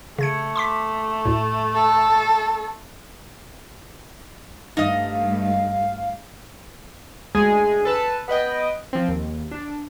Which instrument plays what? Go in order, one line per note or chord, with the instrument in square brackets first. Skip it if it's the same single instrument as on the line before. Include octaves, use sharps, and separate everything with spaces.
[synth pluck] C#3 G#6 C#7 [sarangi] A3
[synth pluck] C6 D6 B6
D2 A2
[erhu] A4
[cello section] G2 A3 [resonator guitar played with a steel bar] D#4 D#5 [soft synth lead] F5
[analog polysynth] D2 G#3 G#4 G#5
A4 B4 A5
B3 B4 D#5 G5
F3 C4
D#2
D4